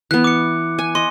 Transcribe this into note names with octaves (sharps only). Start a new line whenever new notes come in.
E3 B3 F#6
D6 C#7
G#5
D#5 C6